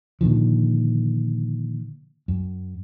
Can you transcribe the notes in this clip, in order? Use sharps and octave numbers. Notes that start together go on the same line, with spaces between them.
A#2 D3 D#3 F3
F#2